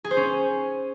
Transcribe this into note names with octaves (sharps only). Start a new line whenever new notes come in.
G#4
C5
C#4